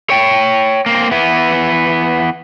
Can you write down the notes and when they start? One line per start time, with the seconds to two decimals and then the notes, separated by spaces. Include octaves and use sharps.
0.10 C#5 G5
0.86 A#3 C4
1.11 E3 B3